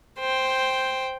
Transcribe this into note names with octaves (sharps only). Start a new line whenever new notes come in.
C5 G5